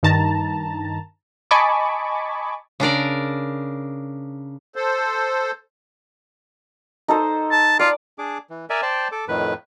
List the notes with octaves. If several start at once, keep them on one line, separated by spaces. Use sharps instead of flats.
G2 D#3 A5 A#5
D#5 G#5 A5 B5 C#6 D6
C#3 D4 A#4 D5
A4 C5
D#4 A4 C5
A5
F4 D5
D4 G#4 D6
E3
A#4 D5 E5 G#5
C5 D5 G5 A5
A4 D6
F2 A2 D#3 B4